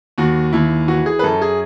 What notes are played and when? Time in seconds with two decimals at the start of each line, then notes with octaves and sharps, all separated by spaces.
0.18 D#2 F#4
0.53 D#2 E4
0.88 E3 F#4
1.06 G#4
1.19 B4
1.23 F#2 A4
1.42 G#4